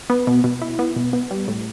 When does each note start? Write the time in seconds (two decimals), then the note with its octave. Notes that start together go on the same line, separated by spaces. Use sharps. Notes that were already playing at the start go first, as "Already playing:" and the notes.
0.10 B3
0.27 B2
0.44 B2
0.62 E4
0.79 B3
0.96 B2
1.13 B3
1.31 G3
1.48 A2